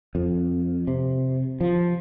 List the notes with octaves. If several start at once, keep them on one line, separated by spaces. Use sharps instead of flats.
F2
C3
F3